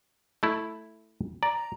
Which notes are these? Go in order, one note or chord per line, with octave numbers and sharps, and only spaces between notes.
A3 E4
D5 A#5